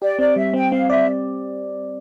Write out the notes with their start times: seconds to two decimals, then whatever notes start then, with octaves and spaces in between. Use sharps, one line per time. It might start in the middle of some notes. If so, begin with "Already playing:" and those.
0.02 G4 D5
0.19 C4 D5
0.36 G3 E5
0.54 C4 G5
0.71 C4 F5
0.89 D5 E5